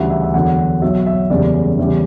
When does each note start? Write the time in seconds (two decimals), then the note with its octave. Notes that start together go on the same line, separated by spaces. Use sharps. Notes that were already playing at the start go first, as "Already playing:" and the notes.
Already playing: D2 C#3 E3 G3 F#5
0.10 E5
0.23 E5
0.34 E2 D3 F#3 F#5
0.82 B1 B2 F#3 E5
1.06 E5
1.30 F#1 E2 C#3 G3 D5
1.79 E2 C#3 E3 G3